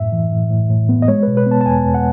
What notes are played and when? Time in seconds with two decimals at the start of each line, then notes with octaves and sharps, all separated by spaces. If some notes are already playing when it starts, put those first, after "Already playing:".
Already playing: F#2 A2 E5
0.12 E3
0.31 A2
0.50 A2
0.70 A2
0.89 B3
1.02 D#5
1.08 G#3 C#5
1.23 B2 B4
1.37 B4
1.47 B3 A5
1.61 A5
1.66 E2 G#5
1.85 E2
1.94 F#5